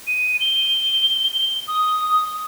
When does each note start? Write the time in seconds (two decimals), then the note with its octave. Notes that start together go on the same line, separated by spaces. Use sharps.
0.07 D#7
0.40 G7
1.34 G7
1.68 D#6